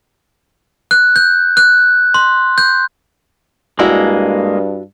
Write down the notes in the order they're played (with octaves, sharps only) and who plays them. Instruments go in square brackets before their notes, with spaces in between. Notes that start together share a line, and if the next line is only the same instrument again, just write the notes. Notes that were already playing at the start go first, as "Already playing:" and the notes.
[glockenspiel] F#6
G6
F#6
C6
G6
[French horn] G2 [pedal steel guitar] G#3 A#3 [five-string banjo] D4 E4 F#4